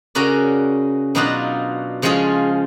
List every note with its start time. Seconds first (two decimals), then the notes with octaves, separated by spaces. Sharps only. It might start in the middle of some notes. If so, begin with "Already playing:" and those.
0.15 C#3 C#4 F#4 A#4 D5
1.15 B2 F#3 D4 D#4 F4 F#4
2.02 C#3 F3 G#3 C#4 F4 G#4